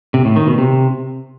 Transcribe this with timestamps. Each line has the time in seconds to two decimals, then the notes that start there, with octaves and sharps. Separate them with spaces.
0.14 C3
0.25 A2
0.36 D#3
0.47 B2
0.58 C3